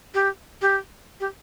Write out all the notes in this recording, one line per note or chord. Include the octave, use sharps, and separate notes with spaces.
G4
G4
G4